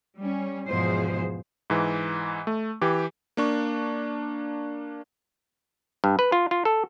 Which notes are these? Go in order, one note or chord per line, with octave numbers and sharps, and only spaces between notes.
G3 C#4
E2 G#2 B2 F3 G#4 C5
G#2 E3
A3
E3 G4
A#3 D4 C#6
G2
B4
F4
F4
A4